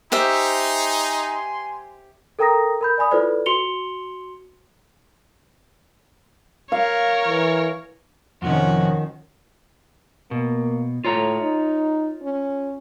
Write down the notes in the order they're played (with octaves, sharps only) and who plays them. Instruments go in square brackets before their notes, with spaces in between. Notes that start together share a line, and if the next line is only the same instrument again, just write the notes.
[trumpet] D#4 [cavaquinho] G4 C5 E5 [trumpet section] G#5 C6
[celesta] A4 A#4 G5 A#5 D#6 A#6
A#4 B5 G6
D5 G#5 B5 D#6
E4 F4 A4 B4 C5 D5
F#4 C6 C#7 F7 G7
[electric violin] A#4 C#5 [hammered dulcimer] F5
[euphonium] E3
[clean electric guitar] F2 A2 C3 [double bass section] D#3 F3 [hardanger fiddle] C#4 F#4
[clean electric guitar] B2 [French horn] A#3
[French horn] A2 [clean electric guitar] F4 C#5 A#5
[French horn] D#4
C#4